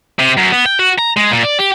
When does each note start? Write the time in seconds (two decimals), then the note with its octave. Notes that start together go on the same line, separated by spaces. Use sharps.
0.19 C3
0.38 F#2
0.52 B3
0.66 G5
0.79 F#4
0.98 A#5
1.17 G#3
1.31 A#2
1.44 D5
1.60 G4